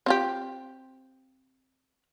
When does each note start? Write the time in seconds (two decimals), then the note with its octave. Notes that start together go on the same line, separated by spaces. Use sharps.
0.06 C4 F4 G4